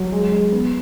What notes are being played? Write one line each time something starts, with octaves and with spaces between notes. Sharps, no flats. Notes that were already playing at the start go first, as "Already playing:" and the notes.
Already playing: F#3
G#3
G#3
B3